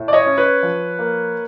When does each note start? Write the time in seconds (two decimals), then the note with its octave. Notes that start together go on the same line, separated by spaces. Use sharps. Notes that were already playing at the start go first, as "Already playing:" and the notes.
Already playing: A2
0.08 D5
0.13 C#5 D#5
0.26 C#4
0.38 B4 C#5
0.63 F3
0.99 A#3